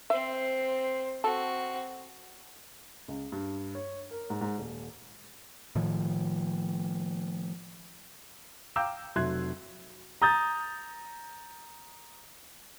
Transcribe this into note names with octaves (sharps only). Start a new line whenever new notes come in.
C4 C5 E5
C4 F#4 A4
C#2
G2
C#5
A#4
G#2
G#2
D#1
A2 D#3 F3
F5 G5 A#5 D6 E6 G6
F1 F#3 E5 C6 F#6 G#6
A#5 D#6 G6 A6